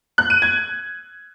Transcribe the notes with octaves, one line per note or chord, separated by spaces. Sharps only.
F#6
D#7
G#6